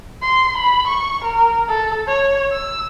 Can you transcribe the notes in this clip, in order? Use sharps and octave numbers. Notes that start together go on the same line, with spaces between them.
C6
B5
C#6
A#4
A4
C#5
E6